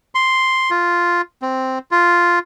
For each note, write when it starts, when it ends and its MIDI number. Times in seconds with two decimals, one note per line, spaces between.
0.15 0.71 84
0.71 1.21 65
1.42 1.79 60
1.91 2.39 65